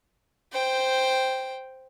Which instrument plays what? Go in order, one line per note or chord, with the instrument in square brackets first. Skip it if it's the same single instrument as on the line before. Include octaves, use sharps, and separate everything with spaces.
[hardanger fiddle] C5 G5